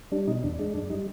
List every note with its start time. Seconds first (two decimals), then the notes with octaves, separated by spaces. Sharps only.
0.12 G3 D4
0.27 B2 D#4
0.43 E2 D4
0.59 G#3 D4
0.74 F#2 D4
0.90 G3 D#4